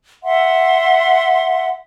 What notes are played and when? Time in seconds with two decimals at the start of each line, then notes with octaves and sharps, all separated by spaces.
0.23 E5 F#5 C6